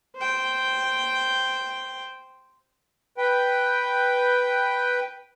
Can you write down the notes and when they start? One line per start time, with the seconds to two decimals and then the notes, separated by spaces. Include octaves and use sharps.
0.16 C5 G5
3.18 B4 G5